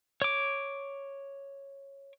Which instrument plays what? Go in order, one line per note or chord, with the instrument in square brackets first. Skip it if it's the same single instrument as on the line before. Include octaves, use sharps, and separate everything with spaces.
[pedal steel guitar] C#5 D6